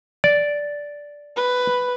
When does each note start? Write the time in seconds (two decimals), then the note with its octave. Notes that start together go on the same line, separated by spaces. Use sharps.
0.24 D5
1.37 B4